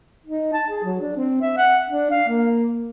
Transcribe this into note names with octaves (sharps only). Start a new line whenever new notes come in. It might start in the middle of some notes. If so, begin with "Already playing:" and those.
D#4
A5
G#4
F#3
D4
C4
E5
F#5
D4
F5
A#3